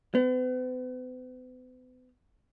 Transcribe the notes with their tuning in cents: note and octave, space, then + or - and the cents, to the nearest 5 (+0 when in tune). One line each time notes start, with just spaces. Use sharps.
B3 +45